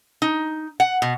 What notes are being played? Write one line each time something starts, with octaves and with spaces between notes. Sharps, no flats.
D#4
F#5
B2